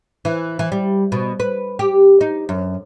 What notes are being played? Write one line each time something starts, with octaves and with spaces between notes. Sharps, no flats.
E3
E3
G3
B2
B4
G4
D#4
F#2